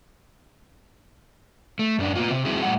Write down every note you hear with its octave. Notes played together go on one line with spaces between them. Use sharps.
A3
F#2 D4
A#3 B3 F4
C3 C4
G3 C4 E4 F#4 G#4
A2 G3 F#5